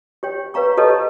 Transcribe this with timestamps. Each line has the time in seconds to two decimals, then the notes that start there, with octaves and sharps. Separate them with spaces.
0.23 G4 C#5 G5
0.54 B4 C#5 F5 A#5 C#6
0.77 G4 A4 B4 C#5 D#5 A5